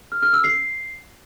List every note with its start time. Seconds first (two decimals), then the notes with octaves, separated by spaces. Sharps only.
0.12 F6
0.22 F6
0.33 E6
0.44 C7